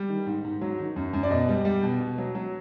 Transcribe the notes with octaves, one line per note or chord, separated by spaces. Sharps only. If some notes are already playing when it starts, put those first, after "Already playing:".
Already playing: G3
D#3
G#2
G#2
F#3
D#3
F#2
F#2
D5
B2 D#5
G3
G3
B2
B2
F#3
F#3